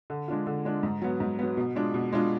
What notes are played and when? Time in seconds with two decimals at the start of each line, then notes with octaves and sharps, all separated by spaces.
0.10 D3
0.28 G#3 D4 F4
0.47 D3
0.65 G#3 D4 F4
0.83 G#2
1.02 F#3 B3
1.20 G#2
1.39 F#3 B3
1.57 B2
1.76 G#3 D4 F4
1.94 B2
2.13 G#3 D4 F4